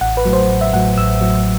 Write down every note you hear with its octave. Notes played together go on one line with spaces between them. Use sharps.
A1 F#5
B4
A2 F#3
C5
A1
E5
A2 F#3 F#5
A1 E6
A2 F#3